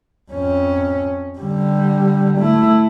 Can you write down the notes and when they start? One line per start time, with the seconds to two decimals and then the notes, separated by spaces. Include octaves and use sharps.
0.31 F2 C#4
1.39 D3 G3
2.38 A3 E4